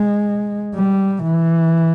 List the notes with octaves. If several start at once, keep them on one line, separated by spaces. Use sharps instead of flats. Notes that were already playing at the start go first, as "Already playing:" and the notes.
Already playing: G#3
G3
E3